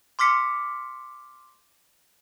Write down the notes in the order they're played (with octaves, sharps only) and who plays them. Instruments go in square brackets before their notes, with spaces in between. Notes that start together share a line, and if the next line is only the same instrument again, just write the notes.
[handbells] C6 D6 F6 B6 C#7